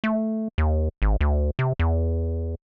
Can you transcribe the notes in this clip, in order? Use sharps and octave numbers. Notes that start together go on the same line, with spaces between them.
A3
D#2
G#1
D2
C3
E2